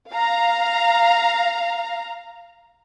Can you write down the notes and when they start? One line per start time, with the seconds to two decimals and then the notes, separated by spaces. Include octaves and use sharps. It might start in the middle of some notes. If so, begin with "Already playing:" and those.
0.12 F5 A#5